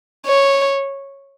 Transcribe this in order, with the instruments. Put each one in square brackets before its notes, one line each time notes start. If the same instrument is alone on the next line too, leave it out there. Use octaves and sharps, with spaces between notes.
[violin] C#5